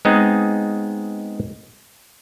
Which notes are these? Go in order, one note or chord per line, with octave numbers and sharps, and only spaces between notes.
G#3 B3 C4 D#4 G#4